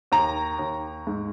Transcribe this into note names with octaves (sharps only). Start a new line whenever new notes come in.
D#2 A#5
D#2
G#2